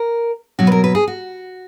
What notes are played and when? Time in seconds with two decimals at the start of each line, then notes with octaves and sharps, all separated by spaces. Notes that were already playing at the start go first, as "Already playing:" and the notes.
Already playing: A#4
0.59 B2 F#3 F#4
0.67 B4
0.72 A#4
0.84 B4
0.95 G#4
1.07 F#4